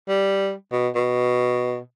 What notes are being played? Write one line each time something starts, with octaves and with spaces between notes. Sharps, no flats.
G3
B2
B2